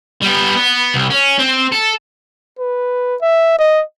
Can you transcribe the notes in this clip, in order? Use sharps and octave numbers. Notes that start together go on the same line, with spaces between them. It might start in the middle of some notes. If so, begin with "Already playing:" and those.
G3 B3
B3
C2
C#4
C4
A4
B4
E5
D#5